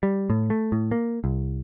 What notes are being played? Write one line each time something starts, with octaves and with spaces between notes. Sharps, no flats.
G3
A2
A3
A2
A#3
C2